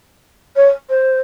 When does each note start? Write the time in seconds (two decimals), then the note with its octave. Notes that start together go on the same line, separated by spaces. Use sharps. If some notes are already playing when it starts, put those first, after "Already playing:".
0.56 C#5
0.89 C5